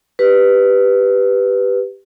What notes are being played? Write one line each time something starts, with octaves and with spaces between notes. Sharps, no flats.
G4 B4